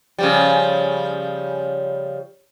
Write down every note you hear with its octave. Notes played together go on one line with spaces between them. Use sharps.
C#3 F3 G3